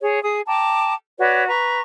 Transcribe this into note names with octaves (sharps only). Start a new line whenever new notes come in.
G#4 C#5
G#4 D#6
G5 A5 A#5 D6
F#4 B4 C#5 D5
B4 A#5 C#6